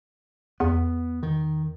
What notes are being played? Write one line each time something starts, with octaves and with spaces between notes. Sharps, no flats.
E2 B3
D#3